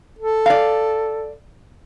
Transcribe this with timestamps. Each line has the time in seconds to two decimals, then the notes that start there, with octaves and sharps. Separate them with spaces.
0.19 A4
0.46 D5 F5